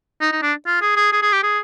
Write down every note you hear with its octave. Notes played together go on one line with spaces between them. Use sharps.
D#4
D#4
D4
F4
G#4
G#4
G#4
G#4
G4
G#4